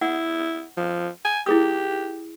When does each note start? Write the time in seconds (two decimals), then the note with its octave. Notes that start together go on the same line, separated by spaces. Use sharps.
0.01 E4 F#5
0.77 F3
1.25 G#5
1.46 E4 G4 G#4 D#6